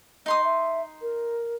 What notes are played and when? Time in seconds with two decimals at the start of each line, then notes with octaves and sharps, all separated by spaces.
0.26 D#4 D#5 C6 D#6
0.44 E5
1.01 A#4